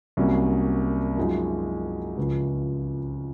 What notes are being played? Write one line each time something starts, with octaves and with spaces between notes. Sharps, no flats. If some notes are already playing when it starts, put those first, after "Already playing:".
C2 C3 F#3 A#3 C#4
F#2 F3 G#3 D#4 F#4
C#2 C#3 F3